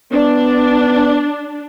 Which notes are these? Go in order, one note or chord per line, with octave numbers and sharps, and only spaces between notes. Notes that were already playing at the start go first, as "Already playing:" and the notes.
B3 D4